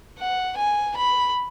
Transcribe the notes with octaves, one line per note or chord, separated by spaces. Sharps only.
F#5
G#5
B5